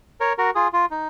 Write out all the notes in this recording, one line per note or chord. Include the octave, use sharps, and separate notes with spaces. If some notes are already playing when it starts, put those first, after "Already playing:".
A#4 C#5
F#4 A#4
F4 G#4
F4
D#4